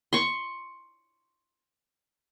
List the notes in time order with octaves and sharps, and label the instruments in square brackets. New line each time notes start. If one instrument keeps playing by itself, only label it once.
[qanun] C6 C#6